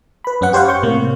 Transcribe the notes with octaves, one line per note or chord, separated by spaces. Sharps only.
B4 B5
F#2 C#4 B4 F#5
G4 C5 C#5 F5 F#5
C#6 G6
A2 C3 A#3